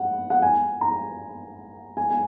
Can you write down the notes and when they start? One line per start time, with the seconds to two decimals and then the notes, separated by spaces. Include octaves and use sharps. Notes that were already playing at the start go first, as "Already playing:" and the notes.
Already playing: F#5
0.30 F#5
0.42 G#5
0.81 A#5
1.97 G#5
2.10 G#5